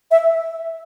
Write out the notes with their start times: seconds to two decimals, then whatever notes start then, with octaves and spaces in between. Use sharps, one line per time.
0.11 E5